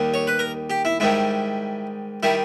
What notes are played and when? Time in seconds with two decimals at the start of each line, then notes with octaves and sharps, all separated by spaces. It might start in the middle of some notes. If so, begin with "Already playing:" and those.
Already playing: D#2 D#3 G3
0.14 C#5
0.27 B4
0.39 A#4
0.70 G4
0.85 E4
1.00 G#2 D#3 G3 E4
2.23 D#3 G3 E4